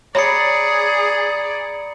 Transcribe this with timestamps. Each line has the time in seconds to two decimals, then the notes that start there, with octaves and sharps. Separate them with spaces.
0.15 G#4 C#5 D5 A#5 B5 C#7